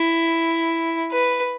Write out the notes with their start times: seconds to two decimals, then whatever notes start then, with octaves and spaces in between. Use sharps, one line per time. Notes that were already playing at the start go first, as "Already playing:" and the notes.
Already playing: E4
1.12 B4